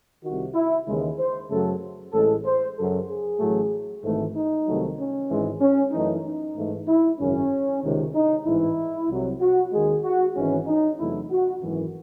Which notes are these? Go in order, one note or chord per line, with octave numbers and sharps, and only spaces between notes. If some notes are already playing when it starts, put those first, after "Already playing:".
C2 C3 D#3 F#4
E4
D#2 C#3 E3 G#3
C5
F#2 C#3 F#3 A3 A4
A1 A2 G#3 A4
C5
F#2 C#3 F#3 A4
G#4
A1 A2 F#3 A3
G#1 G#2 E3 A3
D#4
C2 C3 D#3 F#3 A3
C#4
G#1 G#2 E3 G#3
C#4
F#2 E3 A3 D#4
D#4
G#2 E3 A3
E4
G#1 F#2 C#3 C#4
C#2 C3 D#3
D#4
A1 G#2 E3 G#3 E4
C2 C3 F#3
F#4
D#2 D#3 G#3 G#4
F#4
G#1 G#2 E3 G#3 C#4
D#4
E2 C3 F#3 A3 E4
F#4
G#1 F#2 E3